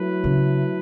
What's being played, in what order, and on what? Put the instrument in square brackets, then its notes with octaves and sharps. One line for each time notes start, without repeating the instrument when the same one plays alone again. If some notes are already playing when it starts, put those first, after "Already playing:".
Already playing: [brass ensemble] F#3 A3 E4 B4
[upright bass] C#3